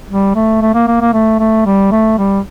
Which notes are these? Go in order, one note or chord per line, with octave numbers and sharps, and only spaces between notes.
G3
A3
A3
A#3
A#3
A#3
A3
A3
G3
A3
G3